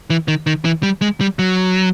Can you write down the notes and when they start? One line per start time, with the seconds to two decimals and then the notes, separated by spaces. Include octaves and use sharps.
0.10 E3
0.28 D#3
0.47 D#3
0.65 E3
0.83 G3
1.01 G#3
1.21 G3
1.39 F#3